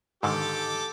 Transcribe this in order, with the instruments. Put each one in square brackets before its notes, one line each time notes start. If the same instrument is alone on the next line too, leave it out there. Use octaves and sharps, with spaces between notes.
[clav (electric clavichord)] G#2 D3 D#3 [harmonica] G4 A4 D6